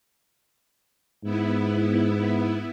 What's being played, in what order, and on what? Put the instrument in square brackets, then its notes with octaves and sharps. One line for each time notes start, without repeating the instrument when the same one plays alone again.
[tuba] G#2 [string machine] B3 E4